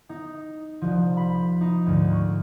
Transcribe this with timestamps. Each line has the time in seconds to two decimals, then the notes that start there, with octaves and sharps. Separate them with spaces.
0.09 D#4
0.81 C2 F3
1.17 B5 B6
1.61 D#4
1.86 D2 G#2
2.13 C#6